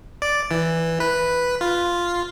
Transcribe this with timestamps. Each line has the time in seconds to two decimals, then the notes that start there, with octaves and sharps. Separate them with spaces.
0.22 D5
0.51 E3
1.00 B4
1.61 F4